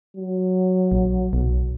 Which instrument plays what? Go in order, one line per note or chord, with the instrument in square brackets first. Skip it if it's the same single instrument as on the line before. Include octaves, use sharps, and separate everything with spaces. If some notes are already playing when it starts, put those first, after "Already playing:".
[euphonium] F#3
[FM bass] A#1
B1